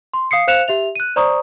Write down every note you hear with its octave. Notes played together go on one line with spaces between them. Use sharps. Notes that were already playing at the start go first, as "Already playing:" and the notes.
C6
F5 D#6 C7 C#7
C5 F5 F#6 C#7 E7 F7
G4 E5 F7
F#6 D#7
C5 D5 A#5 C#6 D#6